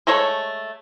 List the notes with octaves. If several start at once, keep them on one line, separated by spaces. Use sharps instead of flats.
G#3 A3 A4 C#5